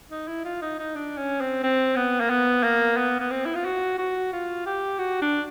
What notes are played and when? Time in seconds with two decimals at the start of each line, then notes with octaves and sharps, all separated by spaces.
0.11 D#4
0.28 E4
0.45 F4
0.62 D#4
0.79 D#4
0.96 D4
1.18 C#4
1.40 C4
1.63 C4
1.96 B3
2.21 A#3
2.30 B3
2.63 A#3
2.97 B3
3.20 B3
3.31 C4
3.46 E4
3.55 F4
3.65 F#4
3.98 F#4
4.33 F4
4.66 G4
4.99 F#4
5.21 D4